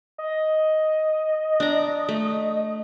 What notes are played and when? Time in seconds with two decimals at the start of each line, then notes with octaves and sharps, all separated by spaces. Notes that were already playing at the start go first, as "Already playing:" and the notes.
0.18 D#5
1.60 D4 A#5
2.09 A3